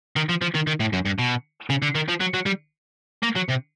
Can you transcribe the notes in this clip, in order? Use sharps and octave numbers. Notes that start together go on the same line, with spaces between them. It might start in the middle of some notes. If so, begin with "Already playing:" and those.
D#3
F3
F3
D#3
D#3
A2
F#2
G2
B2
C#3
D3
D#3
F3
F#3
F#3
G3
A#3
F#3
C3